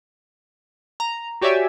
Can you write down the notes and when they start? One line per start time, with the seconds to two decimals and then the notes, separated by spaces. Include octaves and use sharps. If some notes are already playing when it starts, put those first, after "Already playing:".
1.00 A#5
1.41 F#4 G4 C#5 D5 E5 G#5